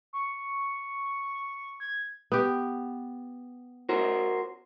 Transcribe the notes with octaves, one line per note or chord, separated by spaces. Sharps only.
C#6
G#6
B3 G4
F#4 A#4 C5